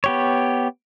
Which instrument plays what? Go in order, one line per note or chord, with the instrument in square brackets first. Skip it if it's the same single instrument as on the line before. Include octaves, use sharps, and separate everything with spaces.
[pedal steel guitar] B3 G4 C#5